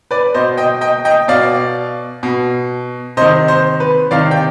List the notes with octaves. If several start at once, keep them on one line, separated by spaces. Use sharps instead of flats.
B4 D5
B2 C5 D#5
D#5 G5
D#5 G5
D#5 G5
B2 D5 F5
B2
C3 D#3 C5 D#5
C5
B4
C3 D#3 D5 F5
G5